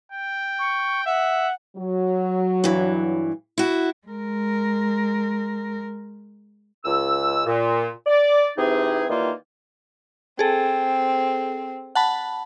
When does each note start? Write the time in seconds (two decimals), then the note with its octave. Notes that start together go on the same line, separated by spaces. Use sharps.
0.12 G5
0.59 C#6
1.06 E5 F#5
1.77 F#3
2.64 G2 E3
3.58 E4 F#4
4.08 G#3 A#4
6.85 C#2 E6
7.46 A#2
8.06 D5
8.57 C3 E3 C4 D#4 G#4
9.09 D#3 E3 G3 A#3 D#4 F4
10.39 C4 G#4 A4
11.95 F#5 A5 B5